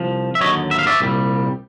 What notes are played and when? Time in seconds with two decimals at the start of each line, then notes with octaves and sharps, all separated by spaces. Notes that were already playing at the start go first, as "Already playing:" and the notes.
Already playing: C2 F3
0.35 E5
0.41 D#2 D3 F#3 C#5 D#5
0.71 E5
0.79 F5
0.87 D5 E5
1.01 C2 A#2 G3